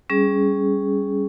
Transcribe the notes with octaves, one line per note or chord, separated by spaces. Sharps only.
G3 C#4 G#4